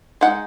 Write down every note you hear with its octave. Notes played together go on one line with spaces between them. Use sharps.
G#3 D#4 F#5